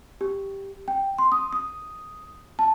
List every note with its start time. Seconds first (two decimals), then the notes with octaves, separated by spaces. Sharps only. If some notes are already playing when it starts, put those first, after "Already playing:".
0.21 G4
0.88 G5
1.18 C6
1.32 D#6
1.53 D#6
2.59 A5